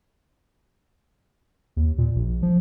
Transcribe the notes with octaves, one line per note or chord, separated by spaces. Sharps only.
D#2
A#2
A#1
F3